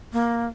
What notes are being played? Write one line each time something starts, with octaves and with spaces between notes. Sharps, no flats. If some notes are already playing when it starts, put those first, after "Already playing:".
A#3